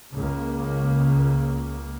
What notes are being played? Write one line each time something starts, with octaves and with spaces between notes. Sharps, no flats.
C#2 C#3 A#3